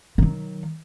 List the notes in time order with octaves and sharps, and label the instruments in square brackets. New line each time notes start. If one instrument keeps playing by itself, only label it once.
[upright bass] D#3 F#3